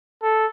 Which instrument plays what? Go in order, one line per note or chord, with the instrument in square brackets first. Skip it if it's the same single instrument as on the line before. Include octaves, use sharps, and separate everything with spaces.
[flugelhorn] A4